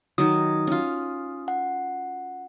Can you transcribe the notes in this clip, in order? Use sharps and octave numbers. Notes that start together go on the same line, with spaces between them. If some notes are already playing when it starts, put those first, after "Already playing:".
D#3 F#3 D#6
C#4 F4
F#5